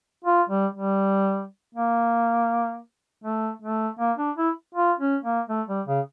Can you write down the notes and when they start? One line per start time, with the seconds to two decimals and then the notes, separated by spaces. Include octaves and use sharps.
0.25 F4
0.49 G3
0.75 G3
1.75 A#3
3.24 A3
3.62 A3
3.99 A#3
4.17 D4
4.37 E4
4.75 F4
4.99 C#4
5.23 A#3
5.49 A3
5.68 G3
5.87 C#3